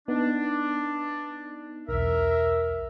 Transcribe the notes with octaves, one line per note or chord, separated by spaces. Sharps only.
B3 D4 D#4
B1 E2 A#4 E5